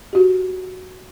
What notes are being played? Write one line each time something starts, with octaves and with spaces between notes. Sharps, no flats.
F#4 G4